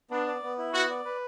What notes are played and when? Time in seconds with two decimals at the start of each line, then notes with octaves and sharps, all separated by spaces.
0.11 B3 D4
0.27 D5
0.43 B3
0.58 E4
0.74 B3 F#4
0.90 D5
1.05 B4